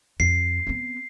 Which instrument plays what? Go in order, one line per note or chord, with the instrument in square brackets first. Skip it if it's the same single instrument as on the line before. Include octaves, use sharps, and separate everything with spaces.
[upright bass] F2 [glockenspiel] C7
[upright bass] B3 C4